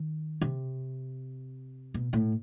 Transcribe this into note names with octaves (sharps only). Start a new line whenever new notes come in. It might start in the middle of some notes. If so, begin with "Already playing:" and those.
Already playing: D#3
C3
B2
A2